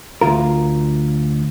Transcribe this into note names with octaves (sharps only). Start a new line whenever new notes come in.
D2 F4 A#4